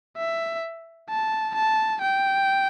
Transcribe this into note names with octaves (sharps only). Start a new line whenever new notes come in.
E5
A5
A5
G5